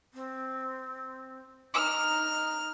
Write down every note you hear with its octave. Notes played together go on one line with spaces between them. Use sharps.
C4
D#4 F6